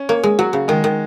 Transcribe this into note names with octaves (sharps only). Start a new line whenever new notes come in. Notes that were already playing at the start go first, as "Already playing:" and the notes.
Already playing: C#4
A#3 C#5
G#3
F#3 F#4
C#3
D#3 G#3
D#3